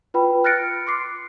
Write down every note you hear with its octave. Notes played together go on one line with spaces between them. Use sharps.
F4 B4 G5 B5
F6 F#6 A6 A#6 C#7 D7
C6 D6 C7